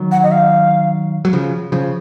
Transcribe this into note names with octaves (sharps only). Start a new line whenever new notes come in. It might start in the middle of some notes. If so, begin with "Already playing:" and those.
Already playing: D#3 F#3
F#5
D#5
F5
F#3
C#3 F3
C#3 F3